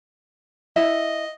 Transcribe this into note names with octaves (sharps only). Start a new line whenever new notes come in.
E4 D#5 E5 F#5